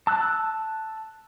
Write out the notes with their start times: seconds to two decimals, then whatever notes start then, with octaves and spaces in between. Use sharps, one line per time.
0.07 A5 E6 F#6